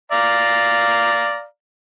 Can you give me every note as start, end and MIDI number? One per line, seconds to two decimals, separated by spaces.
0.12 1.44 74
0.12 1.44 77
0.12 1.44 82